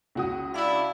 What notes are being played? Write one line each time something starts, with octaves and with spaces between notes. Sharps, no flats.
C#2 F#4 D#6
D4 E4 D5 F5